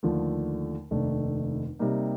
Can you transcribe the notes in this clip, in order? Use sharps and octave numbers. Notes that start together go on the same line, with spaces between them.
D#2 D3 F3 A3
F1 D#2 D#3 A3 D4
C3 G3 A#3 D#4